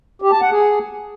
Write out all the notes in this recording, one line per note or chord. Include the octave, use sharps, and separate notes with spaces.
G4
A5
F#5
G#4